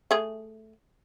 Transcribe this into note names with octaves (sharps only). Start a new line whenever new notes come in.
A3 G#4